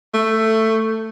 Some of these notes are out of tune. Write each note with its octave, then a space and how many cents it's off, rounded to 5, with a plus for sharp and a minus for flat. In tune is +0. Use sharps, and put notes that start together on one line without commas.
A3 +10